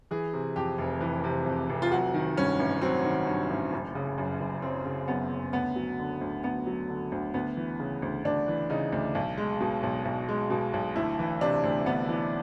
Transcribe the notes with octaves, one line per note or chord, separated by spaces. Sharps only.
E3 G#4
C3
F2 G4
F1
E3
C3
F2
F1
F4
F#3 F#4
D#3
G2 C#4
A1
F#3 C4
D#3
G2
A1
F#1
C#3
F#2
F#1
F#1 C4
C#3
F#2 B3
F#1
D2 B3
F#3
D3
D2
D2 B3
F#3
D3
D2
D2 B3
E3
C#3
D2
D2 D4
E3
C#3 D#4
D2
B1
G#3
B2
B1
B1
G#3
B2
B1
D2 E4
E3
C3 D4
D2
D2 B3
E3